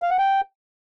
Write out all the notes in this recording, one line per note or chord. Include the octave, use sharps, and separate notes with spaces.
F5
F#5
G5